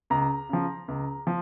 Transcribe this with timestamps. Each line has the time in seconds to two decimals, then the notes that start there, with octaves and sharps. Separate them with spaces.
0.10 C#2 A#5
0.49 C#3 F3
0.88 C#2
1.27 F3